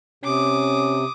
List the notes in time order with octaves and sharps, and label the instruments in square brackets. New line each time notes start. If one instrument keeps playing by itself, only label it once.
[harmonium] C3 [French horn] C#4 [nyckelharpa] D6 D#6